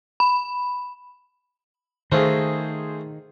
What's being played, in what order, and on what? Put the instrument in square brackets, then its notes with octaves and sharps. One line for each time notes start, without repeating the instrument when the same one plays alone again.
[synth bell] B5
[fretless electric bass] D#3 [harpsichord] A3 F4 F#4 [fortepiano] G#4 C5